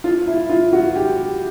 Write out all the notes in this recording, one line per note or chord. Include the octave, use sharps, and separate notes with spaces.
F4
E4
F4
F#4
G4